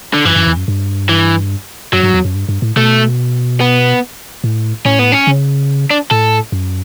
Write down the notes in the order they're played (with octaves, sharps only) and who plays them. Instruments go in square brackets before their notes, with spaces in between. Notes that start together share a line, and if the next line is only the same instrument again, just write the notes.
[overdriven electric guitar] D3
[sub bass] F#2 [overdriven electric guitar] E3
[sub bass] F#2
E2
F#2
G2
[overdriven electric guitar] E3
[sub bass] F#2 [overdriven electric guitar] F#3
[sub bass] G2
E2
F#2
G2
G2
A2
[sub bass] B2 [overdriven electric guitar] A3
[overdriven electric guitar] B3
[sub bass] A2
[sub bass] A2 [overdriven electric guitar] C#4
[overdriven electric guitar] B3
C#4
[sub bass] C#3
[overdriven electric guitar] D4
[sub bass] A2 [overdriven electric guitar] A4
[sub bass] F#2